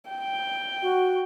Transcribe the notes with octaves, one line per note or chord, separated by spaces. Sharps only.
G5
F#4